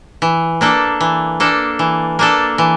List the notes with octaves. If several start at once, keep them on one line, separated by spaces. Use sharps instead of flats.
E3
A#3 D4 A4
E3
A#3 D4 A4
E3
A#3 D4 A4
E3